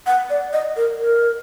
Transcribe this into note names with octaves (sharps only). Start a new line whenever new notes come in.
F#5
D5
D#5
A#4
A#4